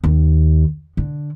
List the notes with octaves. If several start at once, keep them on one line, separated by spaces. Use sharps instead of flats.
D#2
D3